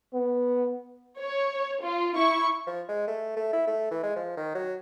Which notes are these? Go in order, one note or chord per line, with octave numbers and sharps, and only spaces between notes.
B3
C#5
F4
E4 C#6
F3
G#3
A3
A3
E4
A3
E3
G#3
F3
D#3
F#3